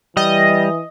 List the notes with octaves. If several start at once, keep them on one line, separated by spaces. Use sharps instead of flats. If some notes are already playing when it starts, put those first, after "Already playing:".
E3 G3 D#5